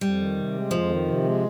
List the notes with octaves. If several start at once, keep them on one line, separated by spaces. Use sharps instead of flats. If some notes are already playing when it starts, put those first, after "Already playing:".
F2 G3
D#3
C3
G#3
F2 F3
D#3
C3
G#3